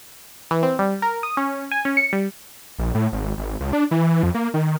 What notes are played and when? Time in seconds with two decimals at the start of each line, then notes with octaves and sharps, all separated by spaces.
0.51 E3
0.63 C4
0.79 G3
1.02 A#4
1.23 D#6
1.37 C#4
1.71 G#5
1.85 C#4
1.97 C#7
2.13 G3
2.78 A#1
2.95 A2
3.13 G#1
3.38 G#1
3.60 C#2
3.73 D4
3.91 E3
4.23 F2
4.34 A#3
4.54 D#3